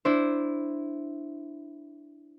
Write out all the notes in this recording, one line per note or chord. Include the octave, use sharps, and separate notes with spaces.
D4 E4 C5